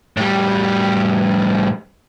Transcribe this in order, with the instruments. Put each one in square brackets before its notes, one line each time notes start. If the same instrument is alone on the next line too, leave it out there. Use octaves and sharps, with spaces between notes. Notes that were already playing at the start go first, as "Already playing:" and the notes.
[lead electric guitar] A2 G3